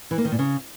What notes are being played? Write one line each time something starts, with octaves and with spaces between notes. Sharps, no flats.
E3
A#3
D#3
A#2
C#3